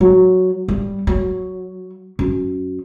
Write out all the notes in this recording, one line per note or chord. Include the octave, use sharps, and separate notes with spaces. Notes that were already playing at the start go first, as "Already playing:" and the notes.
F#3
G3
F#3
F#2